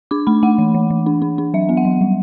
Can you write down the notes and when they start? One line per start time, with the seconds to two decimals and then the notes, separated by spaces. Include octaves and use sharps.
0.11 D4 D6
0.27 A3 B5
0.43 A3 F#5
0.58 E3
0.74 E3
0.90 E3
1.06 D4
1.22 D4
1.38 D4
1.54 F#3 E5
1.69 B3
1.77 F#5
1.85 F#3
2.01 G3